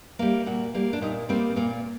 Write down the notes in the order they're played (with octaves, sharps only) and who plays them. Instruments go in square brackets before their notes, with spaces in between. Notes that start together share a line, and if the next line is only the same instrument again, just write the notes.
[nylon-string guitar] G3 A#3
A#2 F#4
G3 A#3
D4
A#2 D#4
G3 A#3 C4
A#2 A#3